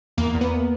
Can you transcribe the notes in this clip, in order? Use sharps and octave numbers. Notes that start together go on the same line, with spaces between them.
E2 A#3
E2
B3